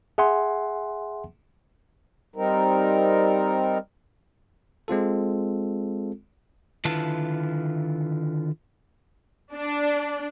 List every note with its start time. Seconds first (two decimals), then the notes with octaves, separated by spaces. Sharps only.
0.18 G#4 E5 F#5 G#5 C6
2.36 G3 C4 D#4 A#4
4.88 G#3 C4 F4 A4
6.85 D3 D#3 E4 F4 B4 A5
9.52 D4